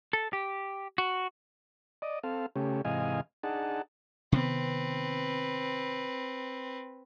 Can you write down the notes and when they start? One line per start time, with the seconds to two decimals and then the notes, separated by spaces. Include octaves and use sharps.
0.13 A4
0.33 G4
0.98 F#4
2.02 D5 D#5
2.23 C4 A4 F5
2.56 C#3 A3 C#4 G4
2.85 G#2 C3 E3 D#5 F5 G#5
3.43 D4 D#4 G#4 F#5 A5
4.32 C3 D#3 B3 C4 B4